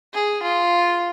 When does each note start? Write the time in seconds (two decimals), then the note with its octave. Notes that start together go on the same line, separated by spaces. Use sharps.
0.13 G#4
0.43 F4